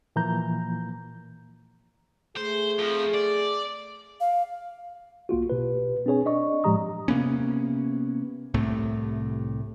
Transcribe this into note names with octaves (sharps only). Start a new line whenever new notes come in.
A#2 E3 F3 A#3 A#5 G6
A3 G#4 C5
F2 F3
D5
F5
B1 A#3 F4 F#4
B2 G4 B4
C4 D4 G#4 C#5 G#5
D4 D5 D#5 C#6
A2 F3 G#3 G4 A#5 D#6
C3 A#3 B3 C#4
C2 A2 C3 A3